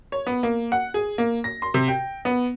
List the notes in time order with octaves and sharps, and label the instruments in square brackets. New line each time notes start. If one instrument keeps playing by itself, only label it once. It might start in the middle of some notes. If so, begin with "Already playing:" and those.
[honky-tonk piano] C#5
B3
A#3
F#5
G#4
A#3
A#6
C6
C3
G5
B3